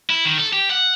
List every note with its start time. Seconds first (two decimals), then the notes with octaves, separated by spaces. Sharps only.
0.10 E4
0.25 D#3
0.37 A4
0.53 G4
0.71 F#5